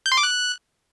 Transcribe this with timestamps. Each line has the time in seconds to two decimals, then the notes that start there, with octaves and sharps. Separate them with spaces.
0.06 G6
0.12 C6
0.18 D6
0.23 F#6